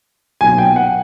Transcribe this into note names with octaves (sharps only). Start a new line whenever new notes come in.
B1 A#2 F#3 B3 G#5
G5
F#5